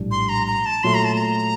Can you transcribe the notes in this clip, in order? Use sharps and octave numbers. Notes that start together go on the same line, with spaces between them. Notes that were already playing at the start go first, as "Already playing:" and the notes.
Already playing: A#1 A2 G3 D4
C6
A#5
A#5
A5
A#2 F#3 A3 C6
A#5
A5
A#5